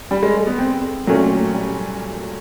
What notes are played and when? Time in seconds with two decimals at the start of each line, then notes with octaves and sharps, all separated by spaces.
0.11 G3
0.23 G#3
0.35 A3
0.47 B3
0.59 C4
1.07 A#2 F#3 A3 C#4
1.54 G3